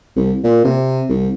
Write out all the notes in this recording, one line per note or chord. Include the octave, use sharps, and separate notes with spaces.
C2
A#2
C3
C2